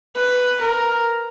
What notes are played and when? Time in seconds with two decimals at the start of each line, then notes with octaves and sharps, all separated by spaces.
0.16 B4
0.61 A#4